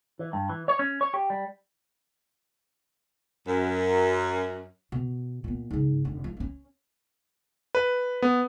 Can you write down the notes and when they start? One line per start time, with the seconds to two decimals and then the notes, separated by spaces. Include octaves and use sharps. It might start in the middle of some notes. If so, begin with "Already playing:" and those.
0.19 E3
0.33 G2
0.49 E3
0.68 C#5
0.79 C#4
1.01 C#5
1.14 G4
1.30 G3
3.46 F#2
4.92 B2
5.44 A#2 B3
5.71 G#2 C#3
6.05 F1 D3
6.24 F3
6.37 A3 C#4
7.75 B4
8.22 B3